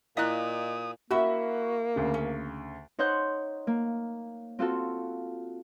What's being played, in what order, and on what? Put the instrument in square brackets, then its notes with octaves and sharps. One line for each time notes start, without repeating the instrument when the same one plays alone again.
[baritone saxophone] A#2 [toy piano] E4 F5 [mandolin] D#5 F#6 [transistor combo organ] D#6
[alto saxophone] A#3 [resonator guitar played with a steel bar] C#4 E4 E5 [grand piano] F#4
[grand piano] D2 C#3
[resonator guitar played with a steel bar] C#4
[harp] D#4 C5 C#5 F#5 F#6 G6
A#3
C4 F4 F#4 A4